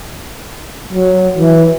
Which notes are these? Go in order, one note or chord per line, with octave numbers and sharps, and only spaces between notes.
F#3
E3